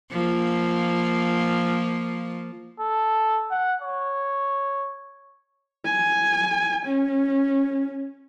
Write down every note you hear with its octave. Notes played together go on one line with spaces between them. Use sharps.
F3 A#3
A4
F#5
C#5
G#5
C#4